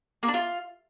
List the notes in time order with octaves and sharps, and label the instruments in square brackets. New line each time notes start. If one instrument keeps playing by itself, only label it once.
[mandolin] A#3
D4
F4